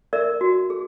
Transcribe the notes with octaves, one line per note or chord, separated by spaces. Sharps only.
A#4 D5 E5
F#4
G#4